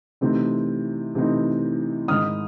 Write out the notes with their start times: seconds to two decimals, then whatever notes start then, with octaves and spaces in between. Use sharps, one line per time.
0.21 C3 E3 A3 C4 D#4
1.15 C3 E3 A3 C4 D#4
2.08 G#2 D#3 G#3 D#6 F6